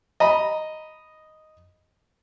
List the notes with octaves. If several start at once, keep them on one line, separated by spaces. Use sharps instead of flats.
D#5 A#5 B5